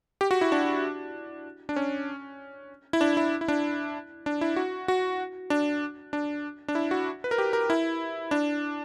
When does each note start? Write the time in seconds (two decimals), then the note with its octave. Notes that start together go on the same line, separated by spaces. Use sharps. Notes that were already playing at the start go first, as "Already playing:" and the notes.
0.21 G4
0.31 F#4
0.41 E4
0.52 D4
1.69 D4
1.76 C#4
2.93 E4
3.01 D4
3.17 E4
3.41 E4
3.48 D4
4.26 D4
4.41 E4
4.56 F#4
4.88 F#4
5.50 D4
6.13 D4
6.68 D4
6.75 E4
6.91 F#4
7.24 B4
7.31 A#4
7.38 G4
7.53 A#4
7.70 E4
8.31 D4